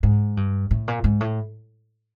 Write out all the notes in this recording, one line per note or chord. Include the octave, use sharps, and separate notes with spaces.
G#2
G2
A2
A#2
G#2
A2